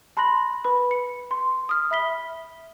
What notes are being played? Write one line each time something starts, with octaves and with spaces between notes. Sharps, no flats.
A5 B5 C6 F#6 A#6 F#7
B4 B5
C#7
C6
D#6 F6
E5 B5 B6 G7